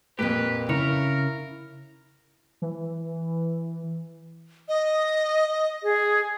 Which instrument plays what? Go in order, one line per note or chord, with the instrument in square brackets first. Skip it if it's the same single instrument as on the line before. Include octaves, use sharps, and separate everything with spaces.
[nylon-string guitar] F2 A#2 A#3 [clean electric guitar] G4 [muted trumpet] B4
[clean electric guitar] C#3 C#5 [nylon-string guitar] E4 [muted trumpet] A#4
[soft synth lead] E3
[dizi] D#5
[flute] G#4